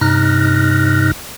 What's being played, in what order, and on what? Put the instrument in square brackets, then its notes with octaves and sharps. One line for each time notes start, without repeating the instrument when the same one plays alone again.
[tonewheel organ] G2 C3 D#4 F6 F#6 A#6